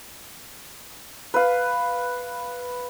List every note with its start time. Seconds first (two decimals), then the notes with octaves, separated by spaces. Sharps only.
1.34 B4 F5